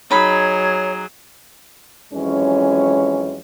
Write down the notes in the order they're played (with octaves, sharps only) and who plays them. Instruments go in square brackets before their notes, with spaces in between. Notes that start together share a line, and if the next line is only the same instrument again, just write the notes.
[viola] F#3 G#4 [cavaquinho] D#4 B5 [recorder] C#5
[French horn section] F2 E3 F#3 G#3 C#4